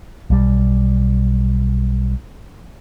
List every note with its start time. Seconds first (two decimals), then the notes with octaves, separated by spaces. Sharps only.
0.30 B1 G3